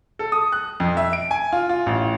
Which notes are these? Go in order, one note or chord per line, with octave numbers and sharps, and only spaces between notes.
A4
D#6
F#6
F2
E5
D7
G#5
F4
F4
A1